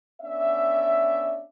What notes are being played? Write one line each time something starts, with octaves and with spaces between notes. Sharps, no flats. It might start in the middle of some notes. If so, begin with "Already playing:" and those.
B3 C#4 D4 D5 E5